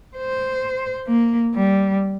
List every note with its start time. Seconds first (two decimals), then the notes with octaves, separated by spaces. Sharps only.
0.17 C5
1.08 A#3
1.55 G3